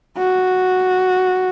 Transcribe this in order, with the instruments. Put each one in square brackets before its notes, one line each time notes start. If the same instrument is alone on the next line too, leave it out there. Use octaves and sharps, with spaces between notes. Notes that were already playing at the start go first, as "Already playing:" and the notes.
[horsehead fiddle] F#4